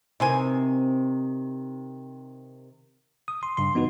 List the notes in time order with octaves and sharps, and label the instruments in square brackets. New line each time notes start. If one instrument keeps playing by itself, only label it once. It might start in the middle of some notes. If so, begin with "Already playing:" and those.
[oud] C3 D#3 [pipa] E3 C5 G#5
[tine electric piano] D#6
C6
G2 C#3 C6
E3 B3 D#4 F#4 B4